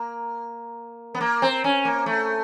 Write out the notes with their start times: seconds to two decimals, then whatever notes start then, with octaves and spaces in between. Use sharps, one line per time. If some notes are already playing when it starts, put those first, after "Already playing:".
Already playing: A#3
1.15 B3
1.20 A#3
1.42 C4
1.64 C#4
1.85 A#3
2.06 A3